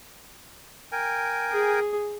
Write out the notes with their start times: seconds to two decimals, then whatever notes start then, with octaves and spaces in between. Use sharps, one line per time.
0.92 A#4 G5 G#5
1.52 G#4